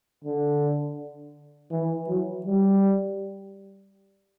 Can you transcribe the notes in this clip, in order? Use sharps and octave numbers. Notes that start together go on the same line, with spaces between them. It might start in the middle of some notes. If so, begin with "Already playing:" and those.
D3
E3
F#3
G3